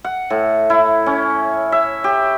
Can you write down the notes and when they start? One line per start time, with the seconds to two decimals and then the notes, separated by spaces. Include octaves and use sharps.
0.04 F#5
0.30 A2
0.70 E4
1.06 C#4
1.72 E5
2.04 G4